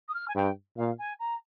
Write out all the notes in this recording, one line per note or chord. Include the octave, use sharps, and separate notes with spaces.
D#6
F6
G#5
G2 G5
A#2 F5
G#5
A#5